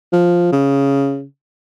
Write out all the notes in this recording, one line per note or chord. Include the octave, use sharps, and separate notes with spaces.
F3
C#3